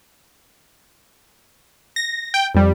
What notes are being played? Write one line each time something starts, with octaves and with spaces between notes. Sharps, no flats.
A#6
G5
F2 G3